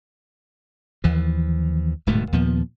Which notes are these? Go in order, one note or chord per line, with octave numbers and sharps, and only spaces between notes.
D#2 E3 F3
D1 G#2 B2 A3
D#2 A#2 F3 B3